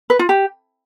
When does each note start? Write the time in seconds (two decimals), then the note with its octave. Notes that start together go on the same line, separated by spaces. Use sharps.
0.10 B4
0.19 F4
0.29 G4